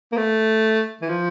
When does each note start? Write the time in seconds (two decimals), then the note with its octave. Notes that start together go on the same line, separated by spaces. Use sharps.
0.12 A#3
0.17 A3
1.02 E3
1.09 F3